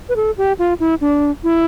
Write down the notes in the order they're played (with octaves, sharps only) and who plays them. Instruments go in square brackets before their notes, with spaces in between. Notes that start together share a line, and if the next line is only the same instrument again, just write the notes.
[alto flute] B4
A4
G4
F4
E4
D4
E4